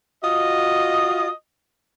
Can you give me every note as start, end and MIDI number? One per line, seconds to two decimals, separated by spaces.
0.24 1.30 65
0.24 1.30 66
0.24 1.30 75